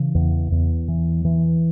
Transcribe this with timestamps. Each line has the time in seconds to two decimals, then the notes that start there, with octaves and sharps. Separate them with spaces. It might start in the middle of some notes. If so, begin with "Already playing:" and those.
Already playing: C#3 E3
0.15 E2
0.52 E2
0.88 E3
1.25 E3